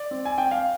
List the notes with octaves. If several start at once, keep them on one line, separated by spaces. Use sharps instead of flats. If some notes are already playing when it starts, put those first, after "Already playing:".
Already playing: D5
C4
G#5
C4 G5
F5